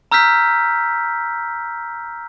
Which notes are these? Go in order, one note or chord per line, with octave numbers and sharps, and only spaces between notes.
A#5 E6 F6 G6 B6